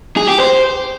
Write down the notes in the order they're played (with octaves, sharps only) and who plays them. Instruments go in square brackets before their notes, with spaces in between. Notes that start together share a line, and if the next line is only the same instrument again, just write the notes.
[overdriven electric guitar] G#4
G4
C5